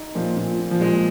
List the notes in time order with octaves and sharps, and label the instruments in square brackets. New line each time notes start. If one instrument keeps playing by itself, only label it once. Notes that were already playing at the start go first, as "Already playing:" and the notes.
Already playing: [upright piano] D#4
[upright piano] A#2 [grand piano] F3
[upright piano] A#2
A#2
[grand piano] F3
[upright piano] A#2 [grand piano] G#3